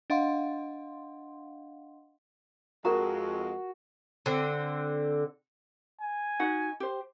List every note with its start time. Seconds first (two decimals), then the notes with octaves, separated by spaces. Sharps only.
0.10 D4 D#5 F5 F#5 C6
2.85 F2 G#3 F#4 A#4 A#5
4.26 D3 C4
6.01 G#5
6.39 D#4 F#4 F#5
6.80 G4 C5